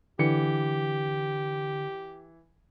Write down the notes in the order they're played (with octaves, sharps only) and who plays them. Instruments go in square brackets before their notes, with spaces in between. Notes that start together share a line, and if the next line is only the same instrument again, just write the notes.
[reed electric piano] D3 [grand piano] E3 C#7 [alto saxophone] G4